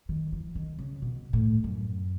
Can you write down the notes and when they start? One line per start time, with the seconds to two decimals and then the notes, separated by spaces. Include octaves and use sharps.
0.09 D#3
0.32 E3
0.55 D#3
0.79 C#3
1.02 B2
1.33 A2
1.64 F#2